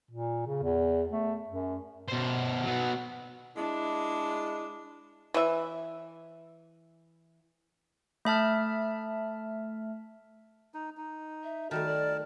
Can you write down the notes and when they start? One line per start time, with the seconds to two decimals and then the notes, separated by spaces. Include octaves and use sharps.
0.11 A#2
0.47 C#3
0.63 E2
1.12 A3
1.48 F#2
2.09 B2 C5
2.64 F#3 B3
3.57 G#3 D4 E4
5.34 E3 E5
8.25 A3 E5 A5 F6
10.74 D#4
10.97 D#4
11.44 E5
11.71 D#3 G3 A3 F#4 A#4 A5
11.86 D5